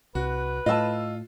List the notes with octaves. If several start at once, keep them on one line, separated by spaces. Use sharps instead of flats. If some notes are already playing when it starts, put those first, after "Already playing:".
C2 F#4 B4
A2 F4 D#5 A5 E6